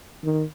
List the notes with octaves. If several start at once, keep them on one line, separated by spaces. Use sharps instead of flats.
D#3